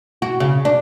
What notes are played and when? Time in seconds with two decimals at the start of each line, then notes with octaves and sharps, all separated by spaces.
0.22 F#4
0.40 C#3
0.65 D4